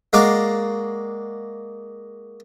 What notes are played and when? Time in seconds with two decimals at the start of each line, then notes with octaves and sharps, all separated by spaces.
0.13 G#3 A#3 F#4 D5 F5